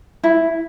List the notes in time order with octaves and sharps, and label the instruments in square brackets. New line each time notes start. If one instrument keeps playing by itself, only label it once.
[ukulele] E4